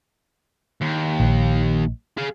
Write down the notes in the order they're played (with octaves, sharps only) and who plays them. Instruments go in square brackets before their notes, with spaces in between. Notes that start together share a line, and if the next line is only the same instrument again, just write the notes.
[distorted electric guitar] D#2
[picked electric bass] A#1
[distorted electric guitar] G#4 F5